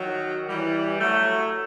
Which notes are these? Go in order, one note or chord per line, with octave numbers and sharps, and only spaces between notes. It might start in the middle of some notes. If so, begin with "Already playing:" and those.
Already playing: D#3 F#3
E3 G3
F#3 A3